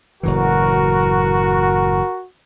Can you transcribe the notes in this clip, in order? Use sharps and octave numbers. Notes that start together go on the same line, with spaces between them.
F#1 A2 E3 F#4 A#4